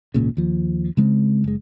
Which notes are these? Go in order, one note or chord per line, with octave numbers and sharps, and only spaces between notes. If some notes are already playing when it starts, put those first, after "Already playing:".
G#1 C#2 A#2 C#3
D#2 F3
C#3 G#3 A#3 C4
F#1 G#3